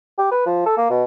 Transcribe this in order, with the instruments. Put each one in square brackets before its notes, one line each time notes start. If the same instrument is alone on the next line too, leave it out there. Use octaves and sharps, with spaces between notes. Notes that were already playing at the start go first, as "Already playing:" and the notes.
[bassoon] G4
B4
F3
A4
A#3
B2